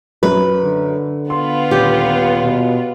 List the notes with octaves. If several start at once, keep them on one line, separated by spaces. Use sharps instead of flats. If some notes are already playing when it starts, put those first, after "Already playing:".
F#2 B4
D3
B3 F4 C6
D#1 G4
B2